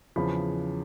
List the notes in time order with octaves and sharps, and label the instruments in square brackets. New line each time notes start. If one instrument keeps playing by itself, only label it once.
[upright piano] E2 C#3 F3 B5